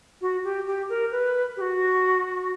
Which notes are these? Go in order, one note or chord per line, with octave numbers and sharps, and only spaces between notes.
F#4
G4
G4
A#4
B4
G4
F#4